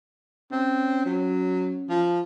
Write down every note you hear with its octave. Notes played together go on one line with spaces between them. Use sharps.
C4 C#4
F#3
F3